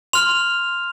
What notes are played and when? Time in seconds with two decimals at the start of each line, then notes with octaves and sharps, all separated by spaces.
0.13 C6 F6 F7